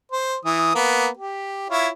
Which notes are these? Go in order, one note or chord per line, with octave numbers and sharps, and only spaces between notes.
C5
E3 D#6
A#3 B3
G4
E4 F4 C#5